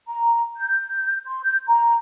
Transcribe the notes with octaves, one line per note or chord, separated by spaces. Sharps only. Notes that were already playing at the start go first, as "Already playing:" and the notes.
A#5
G6
C6
G6
A#5